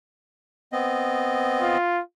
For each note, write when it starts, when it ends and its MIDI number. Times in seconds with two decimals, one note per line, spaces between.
0.73 1.78 59
0.73 1.78 60
0.73 1.78 75
1.62 2.01 65